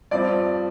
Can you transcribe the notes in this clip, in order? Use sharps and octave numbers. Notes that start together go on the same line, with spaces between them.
G2 F3 C4 D5